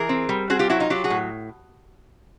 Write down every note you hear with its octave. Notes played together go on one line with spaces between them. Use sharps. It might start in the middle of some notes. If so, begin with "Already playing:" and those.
Already playing: E3 G#4 A#4
C4
G3
C4 F#4 G#4
F4 G4
F#3 E4 F#4
D#4 F4
F#3 F4 G4
F#4 G#4
A2